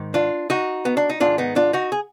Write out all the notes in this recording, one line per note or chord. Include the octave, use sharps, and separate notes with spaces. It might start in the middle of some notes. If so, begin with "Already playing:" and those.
Already playing: G#2 D#3
D4 F4
D#4 F#4
B3
D4
D#4
G#2 D#3 D4 F4
B3 D#4
D4 F4
D#4 F#4
G#4